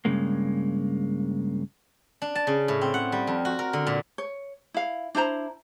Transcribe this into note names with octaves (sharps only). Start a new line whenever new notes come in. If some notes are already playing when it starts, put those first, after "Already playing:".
G2 A#2 C#3 G#3 A#3
D4
A5
C#3
A2
C4
F#5
G3
F2
F#4
A#4
D3
A#2
C#5
E4 F5
D4 E4 C5 A#5